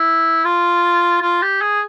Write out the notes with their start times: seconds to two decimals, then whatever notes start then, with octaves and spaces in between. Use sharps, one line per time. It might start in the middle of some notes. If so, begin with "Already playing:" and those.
Already playing: E4
0.45 F4
1.22 F4
1.42 G4
1.61 G#4